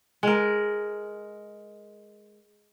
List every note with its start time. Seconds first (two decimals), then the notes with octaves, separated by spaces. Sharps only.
0.23 G#3 A#4